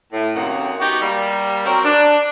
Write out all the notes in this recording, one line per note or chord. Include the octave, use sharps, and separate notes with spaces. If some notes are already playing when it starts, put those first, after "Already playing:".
A2
F#2 C3 D#3 A#3 C4 F#5
B3 D#4 F#4 G4
G3 A#3
F#3 C4 F#4 A#4
D4